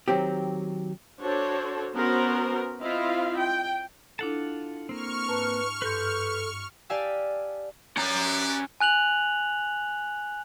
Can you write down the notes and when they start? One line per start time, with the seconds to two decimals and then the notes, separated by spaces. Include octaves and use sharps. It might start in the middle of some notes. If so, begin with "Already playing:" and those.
0.08 D#3 F#3 C4 G4
1.20 D4 F#4 A4 C5 C#5
1.94 B3 C#4 F#4 A#4 C5
2.80 C4 E4 F4 D#5 F5
3.38 G5
4.19 D4 E4 F4 A4 F#5 A5
4.89 A#3 C4 C#6 F6
5.28 G#2 B4 A5 A#5
5.82 G2 A4 B4 C6 G6
6.90 G4 D5 F5 G#5 A5 E6
7.97 C#4 G4 B4 D5 A#5
8.80 G#5 F#6 F7 F#7